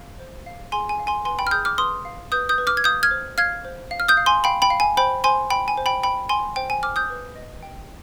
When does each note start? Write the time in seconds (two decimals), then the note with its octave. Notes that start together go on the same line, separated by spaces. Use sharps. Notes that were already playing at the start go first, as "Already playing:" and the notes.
Already playing: F5
0.19 C5
0.46 F5
0.72 G#4 G#5 C6
0.89 G#5
0.99 F5
1.07 G#5 C6
1.25 B4 G#5 C6
1.39 G5 B5
1.47 F6
1.51 G#4 D#6 G6
1.65 D6 F6
1.78 B4 C6 D#6
2.05 F5
2.32 B4 D#6 G6
2.49 D#6 G6
2.58 B4
2.67 D6 F6
2.77 G#6
2.84 F5 D#6 G6
3.03 F6 G#6
3.11 C5
3.38 F5 F6 G#6
3.65 C5
3.91 F5
4.00 F6
4.08 D#6 G6
4.17 F5
4.26 G#5 C6
4.44 F5 G5 B5
4.62 G5 B5
4.70 F5
4.80 G#5
4.97 C5 G5 B5
5.24 C5 G#5 C6
5.50 G5 B5
5.68 G#5
5.77 C5
5.86 G5 B5
6.03 G5 B5
6.29 G5 G#5 C6
6.56 C5 G5
6.70 G#5
6.83 C5 D6 F6
6.96 D#6 G6
7.10 B4
7.36 D#5
7.63 G5